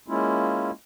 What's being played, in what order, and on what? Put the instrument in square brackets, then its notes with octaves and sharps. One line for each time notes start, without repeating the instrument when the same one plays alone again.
[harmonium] G#3 A#3 C#4 E4 F4